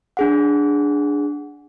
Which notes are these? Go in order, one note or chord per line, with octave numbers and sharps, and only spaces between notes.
D4 G#4 F#5